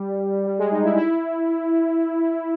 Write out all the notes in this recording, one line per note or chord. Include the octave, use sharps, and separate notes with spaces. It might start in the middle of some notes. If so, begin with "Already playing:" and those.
Already playing: G3
G3
G#3
D#4
E4
E4